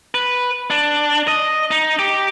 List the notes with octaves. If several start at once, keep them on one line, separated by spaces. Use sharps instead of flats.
B4
D4
D#5
D#4
G4